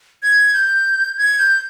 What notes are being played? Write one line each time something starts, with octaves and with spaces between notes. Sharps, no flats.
G#6
G6
G#6
G6